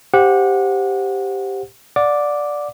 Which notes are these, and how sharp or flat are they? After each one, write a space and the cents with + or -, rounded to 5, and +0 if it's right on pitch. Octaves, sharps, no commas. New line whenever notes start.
G4 +0 C5 +0 F#5 -25
D5 +0 F#5 -35 D6 +0